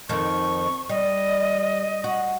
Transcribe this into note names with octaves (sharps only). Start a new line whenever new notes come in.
F2 D#3 C#6
G3 D#5
F#4